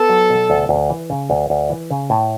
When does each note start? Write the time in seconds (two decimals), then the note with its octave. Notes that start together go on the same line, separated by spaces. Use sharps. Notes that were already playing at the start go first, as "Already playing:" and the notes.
Already playing: B3 A4
0.09 F#3
0.30 B2
0.50 D2
0.69 D2
0.90 E3
1.10 C#3
1.30 D2
1.50 D2
1.70 E3
1.91 C#3
2.10 A2